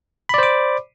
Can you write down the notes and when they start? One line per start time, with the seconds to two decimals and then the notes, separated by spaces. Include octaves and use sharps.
0.29 B5
0.34 D5
0.38 C5
0.43 D6